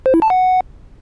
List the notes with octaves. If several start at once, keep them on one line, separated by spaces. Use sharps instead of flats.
C5
E4
A5
F#5